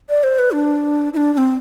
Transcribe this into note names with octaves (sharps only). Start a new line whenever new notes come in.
D5
C5
B4
D4
E4
D4
D4
C4